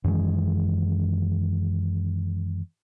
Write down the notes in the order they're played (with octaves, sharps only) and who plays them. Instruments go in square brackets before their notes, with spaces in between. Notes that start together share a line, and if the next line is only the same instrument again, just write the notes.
[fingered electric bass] F#2 D#3 E3 G#3